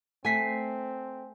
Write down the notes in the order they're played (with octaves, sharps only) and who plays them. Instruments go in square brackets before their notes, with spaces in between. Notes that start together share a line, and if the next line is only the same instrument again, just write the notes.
[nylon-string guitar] A3 [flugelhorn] C4 [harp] G#5 B6 C7